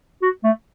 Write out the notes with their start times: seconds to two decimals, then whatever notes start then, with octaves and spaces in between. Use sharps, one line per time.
0.22 F#4
0.44 A3